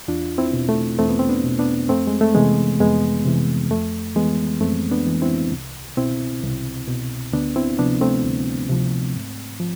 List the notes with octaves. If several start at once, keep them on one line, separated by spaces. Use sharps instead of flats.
E2 D4 F4
C4 E4
B2
A3
E2 A3 C4
B3
C4
B3 D4
B2
B3 D4
F2 A3 C4
G#3
A3
C3 E3 G#3 B3
F2 G#3 B3
C3 E3
F2 A3
E3 G#3 B3
F2 A3 C4
B3 D4
E3
C4 E4
C2
B2 C4 E4
C2
B2
D2 B3 D4
C4 E4
C3 F3 B3 D4
A3 C4
D2
C3 F3
G#2
F3